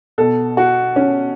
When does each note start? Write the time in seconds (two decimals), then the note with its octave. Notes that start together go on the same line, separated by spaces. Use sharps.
0.18 B2 A4
0.57 F#4
0.96 C#4